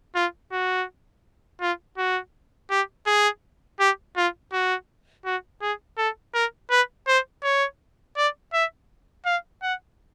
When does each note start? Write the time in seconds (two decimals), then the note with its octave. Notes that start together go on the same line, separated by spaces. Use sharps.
0.15 F4
0.52 F#4
1.61 F4
1.98 F#4
2.71 G4
3.07 G#4
3.80 G4
4.17 F4
4.53 F#4
5.25 F#4
5.62 G#4
5.98 A4
6.34 A#4
6.71 B4
7.08 C5
7.44 C#5
8.17 D5
8.54 E5
9.26 F5
9.63 F#5